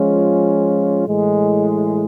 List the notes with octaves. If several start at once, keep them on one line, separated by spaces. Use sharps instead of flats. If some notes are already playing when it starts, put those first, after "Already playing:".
Already playing: F3 G#3 C#4 F4
A2 E3 G#3